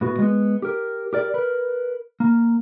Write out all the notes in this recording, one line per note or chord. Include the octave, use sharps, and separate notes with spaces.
A2 B3 F#4
G#3 B3
G4 A#4
G4 A#4 D5
A#4 B4
A#3